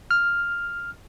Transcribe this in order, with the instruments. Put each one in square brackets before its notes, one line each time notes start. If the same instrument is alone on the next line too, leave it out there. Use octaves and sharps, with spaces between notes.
[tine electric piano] F6